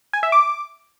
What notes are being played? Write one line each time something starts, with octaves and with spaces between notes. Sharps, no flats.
G#5
E5
D6